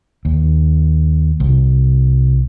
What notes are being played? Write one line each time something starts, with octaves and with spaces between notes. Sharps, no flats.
D#2
C2